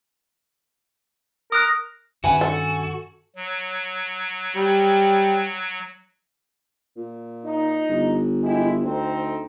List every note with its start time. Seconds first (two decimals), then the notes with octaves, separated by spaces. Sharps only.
1.52 A#4 D#6 F#6
2.24 G2 D#3 C#4 F#4 B4 E5 G#5
2.41 F#4 A4
3.35 F#3
4.56 G3
6.96 A#2
7.44 D#4
7.89 G1
8.43 G#3 E4 G4
8.83 D2 C4 D#4 A4